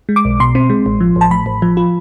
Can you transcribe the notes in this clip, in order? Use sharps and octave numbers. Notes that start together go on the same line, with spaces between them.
G#3
D6
B1
B2 C6
C4
G#3
A1
F3
A1 A5
A2 B5
A1
F3
F4